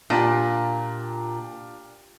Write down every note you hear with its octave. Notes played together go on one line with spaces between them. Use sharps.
A#2 D4 F4 G4